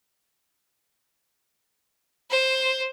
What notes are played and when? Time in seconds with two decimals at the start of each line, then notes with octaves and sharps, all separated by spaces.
2.30 C5